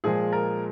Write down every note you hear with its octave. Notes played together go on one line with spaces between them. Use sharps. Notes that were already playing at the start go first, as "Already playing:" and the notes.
A#2 F3 G#3 G#4
A#4